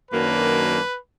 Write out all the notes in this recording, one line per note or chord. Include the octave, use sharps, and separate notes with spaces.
F#2 D#3 F#3 A#3 D4 B4